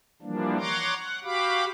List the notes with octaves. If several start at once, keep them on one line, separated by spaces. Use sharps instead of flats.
E3 F3 G3 A#3 D4
C#5 F#5 A#5 C6 D6
F#5
F#4 G4 F5 B5 D6